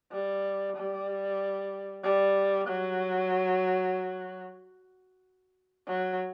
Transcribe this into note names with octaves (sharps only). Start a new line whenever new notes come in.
G3
G3
G3
F#3
F#3